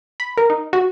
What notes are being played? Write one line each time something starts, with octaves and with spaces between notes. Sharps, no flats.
B5
A#4
D#4
F#4